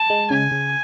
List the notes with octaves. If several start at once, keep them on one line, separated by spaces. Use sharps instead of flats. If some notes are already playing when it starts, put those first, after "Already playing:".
Already playing: A5
G#3
C#3 G#5
C#3